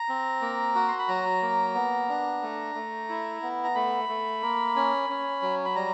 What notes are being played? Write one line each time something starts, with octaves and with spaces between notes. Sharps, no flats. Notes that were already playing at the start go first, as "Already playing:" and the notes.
Already playing: A#5
C4
A#3
F#4
C6
B5
F#3 A#5
A#3
B3
D4
A3
A3
E4
B3
A#5
A3 B5
A3
A#3
C#4
C#4
F#3
B5
G3 A#5